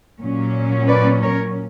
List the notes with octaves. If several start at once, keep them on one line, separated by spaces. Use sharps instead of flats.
A#2 F#3 C#4
B4 D5
A#4 C#5